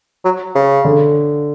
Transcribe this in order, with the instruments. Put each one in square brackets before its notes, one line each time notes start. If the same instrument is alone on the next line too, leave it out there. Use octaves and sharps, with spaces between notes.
[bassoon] F#3
C#3
[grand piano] D3